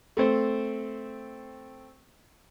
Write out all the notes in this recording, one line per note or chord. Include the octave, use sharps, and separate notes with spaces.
A3 C4 C5